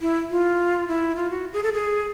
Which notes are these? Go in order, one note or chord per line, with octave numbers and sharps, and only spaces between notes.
E4
F4
E4
F4
F#4
G#4
A4
G#4